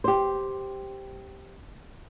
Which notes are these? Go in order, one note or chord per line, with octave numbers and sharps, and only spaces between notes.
G4 C5